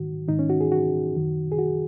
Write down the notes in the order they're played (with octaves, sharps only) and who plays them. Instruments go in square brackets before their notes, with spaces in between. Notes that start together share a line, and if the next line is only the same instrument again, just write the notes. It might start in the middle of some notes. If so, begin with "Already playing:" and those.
Already playing: [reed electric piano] G#2 D#3 F#4
G#2 D#3 D#4
C#4
F#4
G#4
F#4
F#2 D#3
G#4
F#4